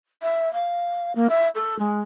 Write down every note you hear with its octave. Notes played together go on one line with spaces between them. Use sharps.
E5
F5
A#3
E5
A4
G#3